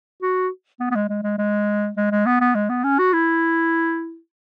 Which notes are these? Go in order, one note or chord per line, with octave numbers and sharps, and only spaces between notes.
F#4
B3
B3
G#3
G#3
G#3
G#3
G#3
G#3
B3
B3
G#3
B3
C#4
F#4
E4